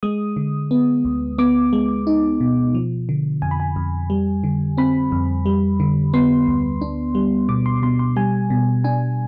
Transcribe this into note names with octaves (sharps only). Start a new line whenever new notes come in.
G#3 D#6
D3
B3
D2
B3 D6
G#3
D#4
B2
F3
D3
F2 G#5
B5
G#5
F2
G3
D3
C4 B5
F2
G3
D3
B3 C6
D2
D4
G3
B2 D6
C6
B2 C6
C6
G3 G#5
B2
D4 G#5